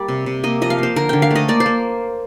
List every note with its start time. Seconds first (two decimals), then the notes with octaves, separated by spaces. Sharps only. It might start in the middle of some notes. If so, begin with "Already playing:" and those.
Already playing: G3 A#3 D5
0.08 C3
0.26 C3
0.43 A#3 D#5
0.61 F3 D#5
0.70 F5
0.78 A#3 C5
0.96 D3 A#4
1.09 D3 G5
1.22 F5
1.31 A3 D#5
1.48 A#3 D5
1.60 C5
1.66 A#3